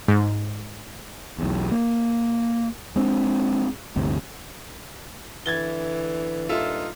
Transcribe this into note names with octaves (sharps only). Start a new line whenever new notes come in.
G#2
B1 E2
A#3
G#3 C4 D4
G1 D2 C3
D3 E3 G#6 A6 G7
G2 A#2 D#4 F4 A4 E5